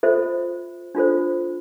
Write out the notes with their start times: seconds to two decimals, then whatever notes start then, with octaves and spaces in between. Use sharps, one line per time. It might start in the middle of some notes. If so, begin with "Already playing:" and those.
0.03 F4 A4 C5 E5
0.95 D4 F4 A4 C5